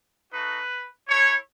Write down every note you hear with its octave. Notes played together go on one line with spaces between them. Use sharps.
A3 D#4 F#4 B4
A3 E4 C#5